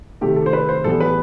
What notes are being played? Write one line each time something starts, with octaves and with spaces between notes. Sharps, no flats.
C3 D#3 A3 G4
A4
C5
B4
C5
A2 E3 G3 B3 A4
B4